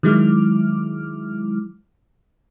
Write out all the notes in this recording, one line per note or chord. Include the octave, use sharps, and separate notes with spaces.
D#3 F#3 G#3 E4 D6 F6